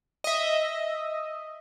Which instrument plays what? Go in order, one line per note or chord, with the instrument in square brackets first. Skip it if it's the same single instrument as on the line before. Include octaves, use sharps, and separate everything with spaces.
[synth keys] D#5 E5